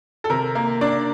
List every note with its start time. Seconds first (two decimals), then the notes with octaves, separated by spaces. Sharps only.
0.24 A4
0.30 C3 A#4
0.55 A#3
0.81 D4 D5